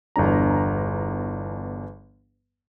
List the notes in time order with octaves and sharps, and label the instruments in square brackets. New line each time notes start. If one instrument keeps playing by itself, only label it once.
[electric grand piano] G1 E2 D4 A#5